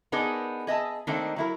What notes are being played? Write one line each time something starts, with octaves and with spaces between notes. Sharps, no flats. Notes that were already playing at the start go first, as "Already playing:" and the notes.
B3 D4 D#4 G#4 A#4
G#4 D#5 E5 A5
D#3 A3 A#3 C4 D4 D#4
F#3 E4 A#4